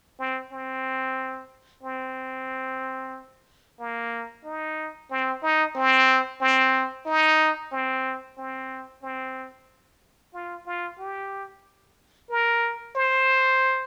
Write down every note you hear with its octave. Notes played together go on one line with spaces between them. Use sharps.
C4
C4
C4
A#3
D#4
C4
D#4
C4
C4
D#4
C4
C4
C4
F4
F4
G4
A#4
C5